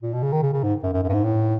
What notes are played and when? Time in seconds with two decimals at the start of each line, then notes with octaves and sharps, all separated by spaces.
0.03 A#2
0.14 B2
0.23 C#3
0.33 D#3
0.43 C#3
0.53 C#3
0.63 G#2
0.83 F#2
0.93 F#2
1.04 F#2
1.09 G2
1.14 G#2
1.24 A2